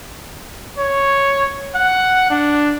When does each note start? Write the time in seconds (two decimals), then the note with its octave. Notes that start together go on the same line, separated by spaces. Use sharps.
0.78 C#5
1.75 F#5
2.30 D4